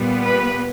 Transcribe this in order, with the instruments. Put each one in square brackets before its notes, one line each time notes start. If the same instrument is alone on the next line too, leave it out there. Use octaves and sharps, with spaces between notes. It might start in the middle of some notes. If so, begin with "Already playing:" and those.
Already playing: [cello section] A#2 G3 B3
B4